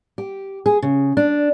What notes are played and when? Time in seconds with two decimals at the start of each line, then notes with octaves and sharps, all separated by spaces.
0.18 G4
0.66 G#4
0.82 C#3
1.17 D4